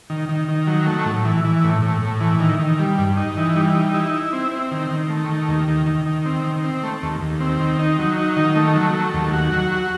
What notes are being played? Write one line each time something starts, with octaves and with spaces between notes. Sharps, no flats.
D#3
D#3
D#3
F#3
A3
A2
E3
E3
A2
A2
A2
E3
D#3
D#3
G3
G2
D#4
E3
G3
D#4
E4
E4
C4
C4
D#3
D#3
A3
D#3
D#2
D#3
D#3
D#3
C4
D#3
C4
A3
D#2
D#2
C4
D#3
D#4
F#3
D#4
D#3
A3
F#3
A3
D#2
F#4
F#3
F#4